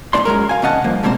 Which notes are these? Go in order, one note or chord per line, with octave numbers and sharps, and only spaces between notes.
B1 A2 C3 C#4 D5 C6
F#2 F#3 G#3 A#4
F5 G#5
D#2 C3 C#4 D#5 F#5 A5
G2 F3 A#3
B2 G3 G#3 A#3 C4 C5